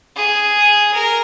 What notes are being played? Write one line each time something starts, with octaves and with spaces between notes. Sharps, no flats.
G#4
A#4